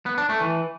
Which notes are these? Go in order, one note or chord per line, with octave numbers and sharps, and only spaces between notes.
B3
D4
A3
E3